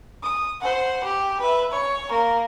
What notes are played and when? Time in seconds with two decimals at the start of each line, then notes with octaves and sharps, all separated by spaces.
0.23 D#6
0.61 C5 F#5
1.04 G4
1.41 B4 E5
1.72 C#5
2.09 A#3 A#4